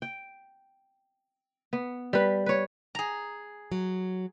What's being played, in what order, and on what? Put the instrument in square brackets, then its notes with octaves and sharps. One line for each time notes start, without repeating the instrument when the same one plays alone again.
[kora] G5
B3
G3 B4
B4 C#5
[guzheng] G#4 A#5
[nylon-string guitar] F#3